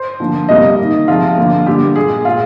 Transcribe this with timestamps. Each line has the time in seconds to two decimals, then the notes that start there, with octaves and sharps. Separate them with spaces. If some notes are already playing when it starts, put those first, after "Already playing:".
Already playing: C5
0.20 D3 F3 A#3
0.49 C3 G3 A#3 D#5
0.78 D#3 A#3
1.08 C3 F3 G#3 F4
1.38 D3 F3 A#3
1.66 D3 G3 A#3 G4
1.96 A#2 G#3 G#4
2.25 A#2 G#3 F4